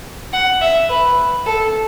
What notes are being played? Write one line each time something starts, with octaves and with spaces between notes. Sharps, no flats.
F#5
E5
B4
A4